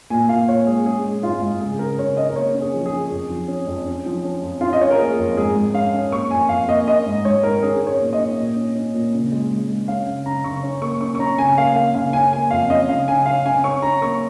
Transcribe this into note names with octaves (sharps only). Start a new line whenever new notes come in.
A#2 G#5
A#2 F5
A#2 C#5
G#3 G#4
C#4 G#4
G#3
G#2 F4
G#2
C#3 G#4
C#3 A#4
C#3 C#5
C#4 D#5
A#4
A#3 C#5
C#4
G#4
F3
G#4
C#4
F2
F3
C#4
F2
C#4
F3
C#4
F2
C#4 F4
D#5
C#4 C#5
A#4
A#3 G#4
F2
G#2 G#4
G#2
C#4 F5
C#4
A#3 C#6
F2 G#5
F2 F5
A#3 D#5
C#4 D#5
G#2
G#2 C#5
D#3 A#4
C#4 G#4
C#4
C#5
A#2
D#5
C#4
A#2
C#4
C#4
A#2
C#3
G#3
G#3
G#3
C#4 F5
C#3
C#3 A#5
C#3 C#6
C#4
A#3 C#6
C#4 C#6
C#6
C#4 A#5
C#3 G#5
G#5
A#3 F5
A#3 F5
C#3 F5
C#4 G#5
A#3 G#5
F2 F5
C#4 D#5
C#3 F5
C#3 G#5
C#4 F5
C#3 G#5
C#4 C#6
C#4 A#5
A#3 C#6